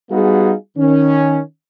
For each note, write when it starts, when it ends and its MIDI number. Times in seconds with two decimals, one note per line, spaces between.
0.11 0.53 55
0.11 0.53 59
0.11 0.53 63
0.11 0.53 65
0.11 0.53 66
0.11 0.53 68
0.77 1.39 51
0.77 1.39 61